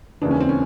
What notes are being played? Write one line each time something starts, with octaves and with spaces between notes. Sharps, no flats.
E1 D#2 C#3 E3 D4
C#4
C4
C#4